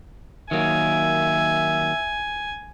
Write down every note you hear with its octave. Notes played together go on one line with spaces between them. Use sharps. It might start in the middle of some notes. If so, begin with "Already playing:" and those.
D#3 F#3 A#3 E5 G#5